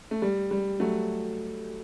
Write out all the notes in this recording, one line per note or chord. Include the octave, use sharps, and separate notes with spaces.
A3
G3
G3
F#3 A3